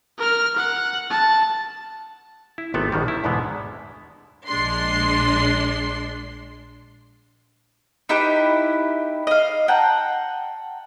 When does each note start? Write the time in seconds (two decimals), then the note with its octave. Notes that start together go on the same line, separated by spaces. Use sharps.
0.18 A#4 F6
0.56 F#5
1.10 A5
2.58 E4
2.74 G#1 C3 A3 B3 A4
2.92 A#1 B2 D#3 G3
3.08 E4
3.24 E2 G#2 B2 D3 G#3 B3
4.46 A#1 G#3 D4 C6 C7
8.09 D#4 E4 G4 B4
9.27 D#5 F5
9.68 F#5 G5 A5 A#5